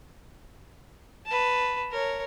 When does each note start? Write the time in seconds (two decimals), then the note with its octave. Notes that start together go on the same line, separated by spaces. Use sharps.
1.26 B4 A5
1.91 A#4 C#5